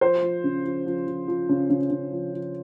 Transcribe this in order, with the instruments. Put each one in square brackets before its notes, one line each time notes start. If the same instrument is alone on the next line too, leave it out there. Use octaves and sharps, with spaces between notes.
[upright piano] F3 C5
F3
C#3
F3
F3
F3
F3
C#3
C#3
C#3
F3
F3